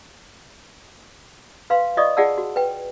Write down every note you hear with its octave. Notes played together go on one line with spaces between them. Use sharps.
B4 F5 C6
F4 D5 D#5 C#6 D#6
F4 G#4 D5 F#5 A5 E6
F#4
B4 G5